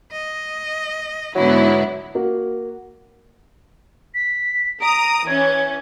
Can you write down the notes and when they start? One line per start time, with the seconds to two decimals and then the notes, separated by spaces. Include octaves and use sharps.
0.12 D#5
1.35 G#2 D3 F#3 B3 E4
2.15 A#3 F#4
4.14 B6
4.81 A#5 D#6 D7
5.27 E3 C#4 G#6